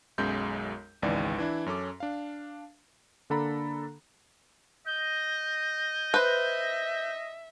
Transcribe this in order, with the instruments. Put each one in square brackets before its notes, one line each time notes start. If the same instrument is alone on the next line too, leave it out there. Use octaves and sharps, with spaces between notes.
[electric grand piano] B1 F#2 G#3 G6
G#1 C#2 E3 D#4 D5
E3 D4 E4
F#2 C#4 A4 D6
D4 F5
D3 A#3 D4 A4 A#5 B5
[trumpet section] D#5 [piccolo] G6
[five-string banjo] B4 C5 [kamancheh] E5